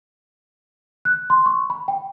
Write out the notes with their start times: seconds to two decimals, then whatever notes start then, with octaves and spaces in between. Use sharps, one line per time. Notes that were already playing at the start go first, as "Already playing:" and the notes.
1.05 F#6
1.30 C6
1.46 C#6
1.70 B5
1.88 G5